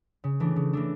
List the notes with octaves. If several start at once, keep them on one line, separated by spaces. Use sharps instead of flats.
C#3
E3 A3 D4
C#3
E3 A3 D4